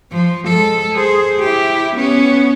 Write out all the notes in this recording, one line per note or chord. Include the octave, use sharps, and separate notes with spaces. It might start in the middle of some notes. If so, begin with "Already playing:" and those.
F3
G#3 A4
G#4 C5
E4 G4
B3 C#4